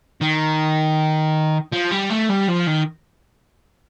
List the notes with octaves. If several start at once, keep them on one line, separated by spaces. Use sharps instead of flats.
D#3
F3
G3
A3
G3
F3
D#3